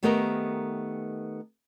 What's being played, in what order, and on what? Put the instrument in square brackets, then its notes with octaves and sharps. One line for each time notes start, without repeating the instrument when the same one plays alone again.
[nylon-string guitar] D#3 A3 B3 G4 A#4 D#5